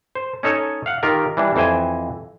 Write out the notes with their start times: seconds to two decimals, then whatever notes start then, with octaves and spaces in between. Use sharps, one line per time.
0.15 C5
0.43 C#4 D#4 A4 C#5
0.86 F5 F#5
1.03 D#3 F4 G4 A#4
1.37 E3 G3 D4
1.56 F2 E3 C5 G5 G#5